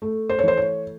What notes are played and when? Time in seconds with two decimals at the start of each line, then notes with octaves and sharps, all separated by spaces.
0.02 A3
0.29 C5
0.39 C#5
0.43 E3 C5
0.57 C#5